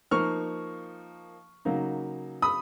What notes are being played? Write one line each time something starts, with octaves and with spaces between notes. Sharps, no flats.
F3 A#3 D#4 C#6 F6
C#3 F#3 A#3 D#4
B5 D#6